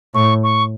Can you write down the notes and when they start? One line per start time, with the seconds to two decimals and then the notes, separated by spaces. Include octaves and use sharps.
0.14 A2 C#6
0.43 C#6